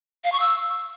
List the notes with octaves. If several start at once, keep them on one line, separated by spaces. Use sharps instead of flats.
F5
C#6
E6